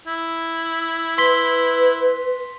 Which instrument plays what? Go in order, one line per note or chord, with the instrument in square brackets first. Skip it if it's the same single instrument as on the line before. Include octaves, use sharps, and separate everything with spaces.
[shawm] E4
[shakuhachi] B4 [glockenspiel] C6 B6 G7